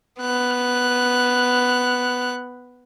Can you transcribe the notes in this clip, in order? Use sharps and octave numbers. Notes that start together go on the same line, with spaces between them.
B3 F#6